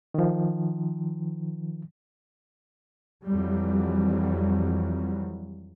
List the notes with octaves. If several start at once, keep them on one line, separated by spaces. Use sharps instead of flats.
D#3 F3
F2 E3 F#3 G3